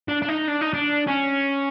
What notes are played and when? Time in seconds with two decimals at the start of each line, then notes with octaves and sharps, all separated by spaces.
0.08 D4
0.22 D4
0.28 D#4
0.48 D4
0.61 D#4
0.74 D4
1.07 C#4